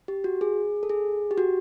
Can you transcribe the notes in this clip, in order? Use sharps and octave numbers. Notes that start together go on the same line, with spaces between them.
G4
F#4
G#4
A4
G#4
G4
F#4